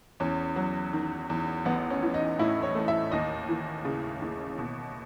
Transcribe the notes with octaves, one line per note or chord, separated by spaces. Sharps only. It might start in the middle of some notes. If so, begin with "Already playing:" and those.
E2 C#4
F#3
D#3
E2
A1 B3
C#4
E3
D#4
A2 E4
C#5
A3
E5
D#2 D#5
E3
C#3
D#2
B2